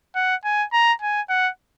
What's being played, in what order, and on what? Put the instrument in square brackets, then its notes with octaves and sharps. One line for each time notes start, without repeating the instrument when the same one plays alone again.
[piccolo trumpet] F#5
G#5
A#5
G#5
F#5